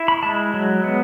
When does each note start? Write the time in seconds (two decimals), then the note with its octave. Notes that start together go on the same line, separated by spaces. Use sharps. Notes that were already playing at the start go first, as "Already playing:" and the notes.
Already playing: E4
0.08 B5
0.23 G#3 A5
0.54 F#3
0.84 B3